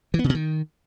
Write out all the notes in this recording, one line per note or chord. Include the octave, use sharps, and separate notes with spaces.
E3
B3
C#3
B2
D#3